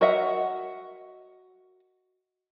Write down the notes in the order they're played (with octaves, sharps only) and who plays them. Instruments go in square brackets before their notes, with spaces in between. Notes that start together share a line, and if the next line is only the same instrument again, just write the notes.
[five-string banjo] F#4 A#4 D#5 E5 F#5